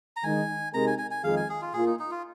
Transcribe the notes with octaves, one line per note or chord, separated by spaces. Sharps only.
A#5
D#3 G#3 D#4 G#5
C3 G#3 D#4 A#4 A#5
G#5
G#5
G#5
F2 D#3 G#3 D#4 G#4 F5
G#5
G#4
F4
A#2 A#3 F4 G#4
D#4
D#4
F4